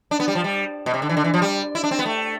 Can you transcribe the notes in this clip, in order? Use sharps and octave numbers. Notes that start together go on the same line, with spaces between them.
D4
B3
G3
F3
G3
B2
C3
D3
E3
D3
E3
F3
G3
E4
D4
C4
B3
A3